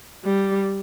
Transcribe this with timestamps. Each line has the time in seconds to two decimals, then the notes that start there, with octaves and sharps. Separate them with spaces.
0.24 G3